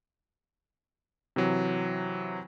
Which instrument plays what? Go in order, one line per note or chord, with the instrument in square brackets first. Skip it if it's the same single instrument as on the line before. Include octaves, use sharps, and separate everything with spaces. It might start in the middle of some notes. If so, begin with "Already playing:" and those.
[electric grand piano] C3 E3 F#3